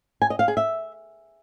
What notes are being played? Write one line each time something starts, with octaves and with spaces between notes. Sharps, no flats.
G#5
D#5
F5
G#4
E5